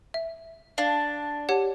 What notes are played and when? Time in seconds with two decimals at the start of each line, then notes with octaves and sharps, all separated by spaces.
0.14 E5
0.78 D4 F5
1.49 G4 C#5 F#5